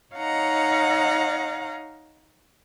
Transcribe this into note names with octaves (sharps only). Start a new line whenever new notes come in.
D#4 C#5 D#5 F5 F#5 A#5